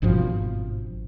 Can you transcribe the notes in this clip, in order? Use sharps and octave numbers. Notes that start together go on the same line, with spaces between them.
G#1 G2 B2 F3